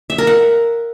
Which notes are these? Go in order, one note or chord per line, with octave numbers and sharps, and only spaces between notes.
E5
A#4
F#5